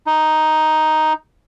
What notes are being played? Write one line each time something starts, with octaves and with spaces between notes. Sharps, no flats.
D#4